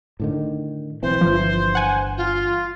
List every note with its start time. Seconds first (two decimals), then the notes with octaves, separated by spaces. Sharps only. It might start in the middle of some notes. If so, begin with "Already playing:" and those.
0.20 A2 D3 D#3
1.03 B1 E3 C4 C5
1.21 G1 G2 E3 F3
1.75 F#5 G#5
2.17 F4